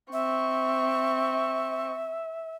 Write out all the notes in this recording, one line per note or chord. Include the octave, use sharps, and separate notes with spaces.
C4 E5 C#6